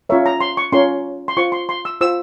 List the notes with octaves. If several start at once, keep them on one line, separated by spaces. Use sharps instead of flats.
C#4 F4 A#4 C#5 E5
A#5
C6
C#6
C#4 F4 A#4 C#5 C6
C6
F4 C5 C#6
C6
C6
E6
F4 C5 E6